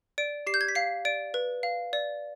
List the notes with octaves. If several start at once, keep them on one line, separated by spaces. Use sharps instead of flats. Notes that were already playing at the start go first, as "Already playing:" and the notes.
D5 D7
G4 C7
G6
G#6
B6
F5 C7
D5 D7
B4
F5
D5